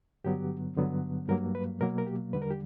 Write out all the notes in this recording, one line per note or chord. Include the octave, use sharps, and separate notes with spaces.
G2 D3 F#3 B3 G4
G2 D3 F#3 B3
G2 F#3 A#3 A#4
B4
B2 F#3 A#3 A#4
A#4
G4
E2 D3 G3 B4
A#4
G4